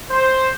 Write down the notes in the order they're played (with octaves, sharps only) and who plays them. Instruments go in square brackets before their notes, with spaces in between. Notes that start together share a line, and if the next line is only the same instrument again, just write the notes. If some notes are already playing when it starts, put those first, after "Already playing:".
[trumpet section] C5